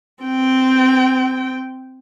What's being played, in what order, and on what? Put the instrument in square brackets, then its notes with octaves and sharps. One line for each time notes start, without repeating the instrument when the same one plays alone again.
[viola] C4 G5